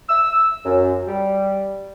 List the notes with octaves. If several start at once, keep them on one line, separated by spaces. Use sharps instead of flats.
E6
F#2
G3